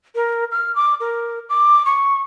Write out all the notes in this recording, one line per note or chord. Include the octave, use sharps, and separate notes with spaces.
A#4
F6
D6
A#4
D6
C#6